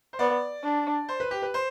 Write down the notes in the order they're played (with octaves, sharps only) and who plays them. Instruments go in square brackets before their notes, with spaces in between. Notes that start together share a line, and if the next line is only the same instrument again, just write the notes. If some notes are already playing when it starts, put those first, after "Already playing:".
[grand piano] C5
[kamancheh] B3 [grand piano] D5
[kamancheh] D4
[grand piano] C5
B4
G4
B4
C5